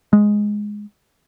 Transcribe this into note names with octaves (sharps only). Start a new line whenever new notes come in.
G#3